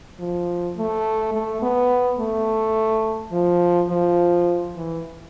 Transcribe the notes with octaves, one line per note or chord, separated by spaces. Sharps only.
F3
A3
A3
B3
A3
F3
F3
E3